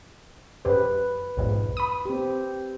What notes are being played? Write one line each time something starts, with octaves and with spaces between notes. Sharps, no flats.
F#2 G4 B4 C5
B1 F2 G#2
B5 D#6
C4 G4